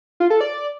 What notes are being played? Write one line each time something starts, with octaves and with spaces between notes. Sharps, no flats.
F4
A4
D5